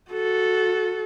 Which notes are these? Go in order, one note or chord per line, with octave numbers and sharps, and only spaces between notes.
F#4 A4